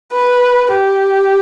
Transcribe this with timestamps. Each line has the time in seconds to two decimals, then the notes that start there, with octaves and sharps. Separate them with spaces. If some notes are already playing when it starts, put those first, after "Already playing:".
0.13 B4
0.73 G4